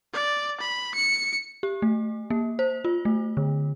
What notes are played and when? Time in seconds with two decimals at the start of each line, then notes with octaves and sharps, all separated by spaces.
0.13 D5
0.60 B5
0.95 C#7
1.63 G4
1.82 A3
2.30 A#3
2.59 C5
2.85 F4
3.05 A3
3.37 D3